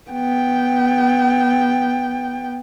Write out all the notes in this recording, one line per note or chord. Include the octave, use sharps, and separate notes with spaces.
B3 G5